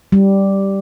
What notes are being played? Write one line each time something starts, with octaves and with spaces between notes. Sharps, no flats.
G3